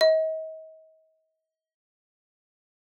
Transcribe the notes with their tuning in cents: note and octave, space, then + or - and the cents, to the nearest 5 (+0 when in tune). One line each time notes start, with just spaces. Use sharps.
D#5 +40